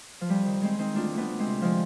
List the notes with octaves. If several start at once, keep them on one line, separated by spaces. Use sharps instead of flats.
F3
F2 G3
D#3
D#3 G#3 C4
D#3 C4 D#4
D2 D4 F4
D2
B3 D4
D2
G#3 C4
C3
D3 F3 G#3